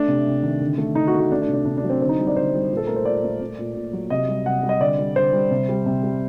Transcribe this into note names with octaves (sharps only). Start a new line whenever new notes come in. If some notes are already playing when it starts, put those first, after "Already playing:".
Already playing: A3 D4
C3
C3
D#3
D3
A3
D3 D#4
F#4
A3
F#4
A3 D4
D4
C3
D4
C3 D4
D4
F#3
C4
D3 C4
D#4
G3
D5
D3 C5
G3
A#2
A4
A3 A#4
C5
A#2 D5
A3
A3
A#2
A#2
F#3
C3 D#5
G3
C3 F#5
G3
D#5
D3 D5
G3
D3 C5
G3
C3
G3
C3
G3